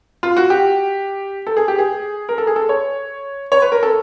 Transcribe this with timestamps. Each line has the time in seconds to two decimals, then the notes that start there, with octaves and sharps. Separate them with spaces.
0.23 F4
0.37 F#4
0.50 G4
1.47 A4
1.57 G#4
1.68 G4
1.78 G#4
2.29 A#4
2.38 A4
2.47 G#4
2.56 A4
2.69 C#5
3.52 C#5
3.62 B4
3.72 A#4
3.83 A4